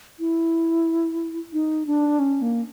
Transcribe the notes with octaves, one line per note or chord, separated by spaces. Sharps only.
E4
D#4
D4
C#4
A#3